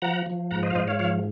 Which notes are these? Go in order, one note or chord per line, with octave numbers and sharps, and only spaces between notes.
F3 F#5 A#5
F3
G#2 F#5 A#5
C5 D#5
F5
G#2 C5 D#5
C#5 F5
F3 C#5 F5